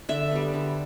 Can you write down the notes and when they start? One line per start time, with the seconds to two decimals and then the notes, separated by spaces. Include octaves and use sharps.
0.09 D3 E5
0.31 G3 B3
0.54 D3